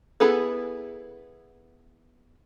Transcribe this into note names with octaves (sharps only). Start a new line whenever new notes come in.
B3 E4 G#4 A4 B4